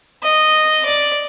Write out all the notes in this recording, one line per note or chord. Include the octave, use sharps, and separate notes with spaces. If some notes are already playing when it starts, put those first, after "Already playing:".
D#5
D5